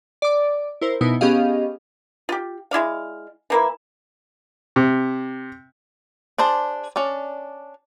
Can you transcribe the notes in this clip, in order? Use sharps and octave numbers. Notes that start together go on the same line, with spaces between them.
D5 D6
E4 A#4 C5
B2 B3 D#4 E4
B3 C#4 G4 G#4 D#5 F5
F4 G4
G#3 E4 D5 F5
E3 A#3 E4
C3
D4 G#4 C5 A5
C#4 D4 D5